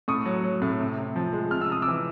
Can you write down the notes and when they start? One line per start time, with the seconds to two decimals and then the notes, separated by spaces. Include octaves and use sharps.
0.08 A2 C#6 D#6
0.26 F#3
0.44 F#3
0.62 A2
0.80 C3
0.98 C3
1.16 F3
1.33 G#3
1.51 C3 F6
1.61 E6
1.69 C3 D#6
1.82 D6 E6
1.88 E3